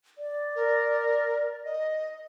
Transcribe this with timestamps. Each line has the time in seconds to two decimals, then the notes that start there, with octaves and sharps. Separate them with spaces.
0.18 D5
0.55 A#4
1.65 D#5